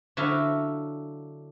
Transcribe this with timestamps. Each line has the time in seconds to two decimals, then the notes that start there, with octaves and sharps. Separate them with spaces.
0.17 D3 F#3 E4 E5 F5